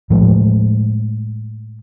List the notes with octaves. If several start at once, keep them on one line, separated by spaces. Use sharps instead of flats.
A2 F3 G#3 A3